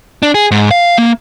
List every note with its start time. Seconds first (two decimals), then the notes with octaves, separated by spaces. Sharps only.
0.23 D4
0.34 G#4
0.51 G#2
0.71 F5
0.98 A#3